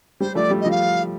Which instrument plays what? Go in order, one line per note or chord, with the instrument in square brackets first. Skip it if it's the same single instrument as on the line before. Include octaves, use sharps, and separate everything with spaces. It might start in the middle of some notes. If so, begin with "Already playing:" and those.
[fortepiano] G3 [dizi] C5
[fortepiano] F3 A3 [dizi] D5
[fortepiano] G3
[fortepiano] F3 [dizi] D#5
[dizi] F5